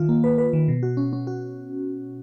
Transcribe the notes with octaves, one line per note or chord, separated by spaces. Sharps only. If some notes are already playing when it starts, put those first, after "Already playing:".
Already playing: D#3 F4
A#3
B4
B4
D#3
B2
F#4
C#4
C#4
F#4